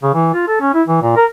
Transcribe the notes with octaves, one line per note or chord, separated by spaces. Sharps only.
C#3
E3
F4
A4
C#4
E4
E3
A#2
A#4